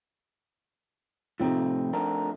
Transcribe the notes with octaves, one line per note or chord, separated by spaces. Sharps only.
A2 C3 F3 A3 C4 D#4
A3 D4 A#4